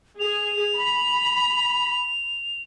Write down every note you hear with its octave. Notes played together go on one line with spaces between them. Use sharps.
G#4 F7
B5